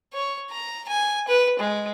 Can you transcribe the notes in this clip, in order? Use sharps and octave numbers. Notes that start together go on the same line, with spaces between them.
C#5
A#5
G#5
B4
G#3